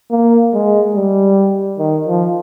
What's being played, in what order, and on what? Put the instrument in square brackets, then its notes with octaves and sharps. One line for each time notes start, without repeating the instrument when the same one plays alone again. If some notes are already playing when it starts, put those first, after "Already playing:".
[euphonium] A#3
G#3
G3
D#3
F3